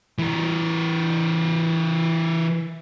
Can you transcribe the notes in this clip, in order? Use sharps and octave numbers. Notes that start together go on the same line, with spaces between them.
E3 A#4